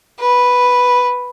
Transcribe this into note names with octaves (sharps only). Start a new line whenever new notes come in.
B4